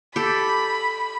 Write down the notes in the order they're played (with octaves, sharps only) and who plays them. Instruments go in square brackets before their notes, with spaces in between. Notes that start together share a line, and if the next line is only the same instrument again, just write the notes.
[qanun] G4 A4 [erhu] B5